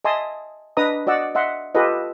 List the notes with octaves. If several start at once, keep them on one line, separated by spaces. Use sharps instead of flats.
D#5 E5 G#5 A5 C6 D#6
D4 B4 D#5 A#5 D#6
F#4 D5 D#5 F#5 E6
D#5 E5 F#5 C6
F4 G4 A4 B4 D#5